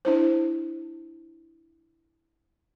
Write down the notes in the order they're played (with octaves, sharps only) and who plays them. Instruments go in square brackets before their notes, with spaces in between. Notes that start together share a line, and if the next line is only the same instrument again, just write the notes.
[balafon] D4 E4 C5